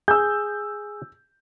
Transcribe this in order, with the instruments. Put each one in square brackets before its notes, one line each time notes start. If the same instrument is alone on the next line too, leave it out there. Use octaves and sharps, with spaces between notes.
[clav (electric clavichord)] G#4 [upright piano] E6 G6